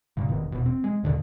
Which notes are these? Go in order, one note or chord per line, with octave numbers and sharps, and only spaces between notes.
G#2 C#3
E1 E2 D#3
E1 B2
C4
G#3
D#2 A#2 D3 D#3